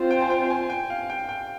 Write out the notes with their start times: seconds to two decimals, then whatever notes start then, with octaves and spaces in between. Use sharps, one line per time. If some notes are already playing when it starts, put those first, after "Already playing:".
Already playing: C4 F4 C5
0.10 G5
0.22 G#5
0.30 G5
0.50 G#5
0.70 G5
0.90 F5
1.10 G5
1.29 G5